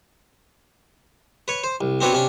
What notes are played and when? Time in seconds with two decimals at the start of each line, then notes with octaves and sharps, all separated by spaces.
1.48 B4 C#5
1.64 C5
1.81 C2
2.01 B3 C4 D4 F#4 B4 C#5
2.13 C3 C#4 D4